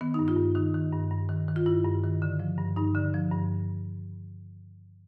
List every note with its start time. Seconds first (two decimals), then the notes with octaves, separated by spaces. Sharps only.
0.01 D#3 B3
0.14 G2 D#4
0.28 F4
0.37 G2
0.55 D#3 D#4
0.74 D#3
0.92 G2
1.11 G2
1.29 D#3
1.48 D#3
1.56 F4
1.66 G2 E4
1.85 G2
2.04 D#3
2.22 D3
2.40 F3
2.58 G2
2.76 G2 D#4
2.95 D3
3.14 F3
3.32 G2